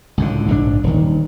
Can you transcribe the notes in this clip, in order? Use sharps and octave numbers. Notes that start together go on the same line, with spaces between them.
C#2 A2 D3
A#1 G#2 F3 D4
D#1 D#3